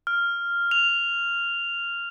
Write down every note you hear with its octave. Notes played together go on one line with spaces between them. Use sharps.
F6
F7